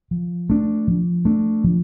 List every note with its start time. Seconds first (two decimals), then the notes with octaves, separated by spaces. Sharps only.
0.11 F3
0.50 A3 D4
0.87 F3
1.25 A3 D4
1.64 F3